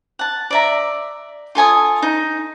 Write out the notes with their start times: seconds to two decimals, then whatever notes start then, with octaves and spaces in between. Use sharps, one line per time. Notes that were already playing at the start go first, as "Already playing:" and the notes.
0.19 F#5 A5
0.50 D5 E5 A#5
1.55 F4 A4 G#5 D#6
2.02 D#4